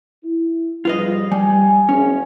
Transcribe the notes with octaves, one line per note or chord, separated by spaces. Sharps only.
E4
G#2 F3 G3 F4 B4 D#5
G3 G#5
F#1 C#4